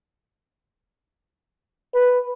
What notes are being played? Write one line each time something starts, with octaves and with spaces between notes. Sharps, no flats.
B4